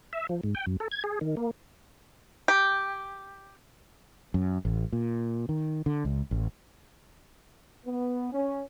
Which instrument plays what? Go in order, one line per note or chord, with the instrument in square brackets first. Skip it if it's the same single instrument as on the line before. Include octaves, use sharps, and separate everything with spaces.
[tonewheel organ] E5
F3
G#2
G5
F#2
A4
G#6
G#4
D#3
A#3
[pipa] G4
[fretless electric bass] F#2
A1
A#2
D#3
D3
C#2
A1
[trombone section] B3
C#4